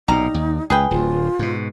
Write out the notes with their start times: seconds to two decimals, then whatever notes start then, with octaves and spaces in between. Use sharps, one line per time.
0.08 B1 A#2 G3 D#4 A#5
0.34 D#2
0.70 C#2 G#4 B4 G5
0.91 D1 D2 F4
1.39 G#2 B2